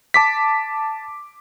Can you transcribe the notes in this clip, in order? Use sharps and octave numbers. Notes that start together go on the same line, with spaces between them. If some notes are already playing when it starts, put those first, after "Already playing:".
A5 D6 B6